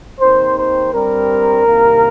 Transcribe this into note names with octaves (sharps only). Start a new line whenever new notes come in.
D#2 D#3 C4 C5
C5
G2 G3 C4 A#4
C2 C3 D#3 A#3